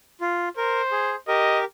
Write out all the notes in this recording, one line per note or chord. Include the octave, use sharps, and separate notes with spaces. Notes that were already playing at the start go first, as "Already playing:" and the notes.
F4
A#4 C5
G#4
G4 A#4 D#5